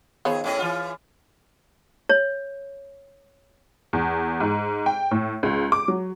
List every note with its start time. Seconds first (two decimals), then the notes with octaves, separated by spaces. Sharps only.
0.25 D#3 F3 B3 G#4 C#5
0.44 A2 C#4 D#5
0.59 E3 F4
2.09 C#5
3.93 E2
4.40 G#2
4.86 G5
5.11 A2
5.43 C#2
5.72 D6
5.88 F#3